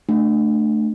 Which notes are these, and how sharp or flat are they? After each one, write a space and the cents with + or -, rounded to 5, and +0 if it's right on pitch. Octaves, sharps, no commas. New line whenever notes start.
A3 +0 D4 +20